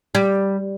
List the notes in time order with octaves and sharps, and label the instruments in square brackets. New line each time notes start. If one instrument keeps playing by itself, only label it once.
[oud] G3